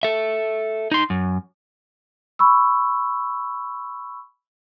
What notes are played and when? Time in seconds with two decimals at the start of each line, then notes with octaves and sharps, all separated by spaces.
0.03 A4 E5
0.91 D#4 C6
1.10 F#2
2.39 B5 C#6 E6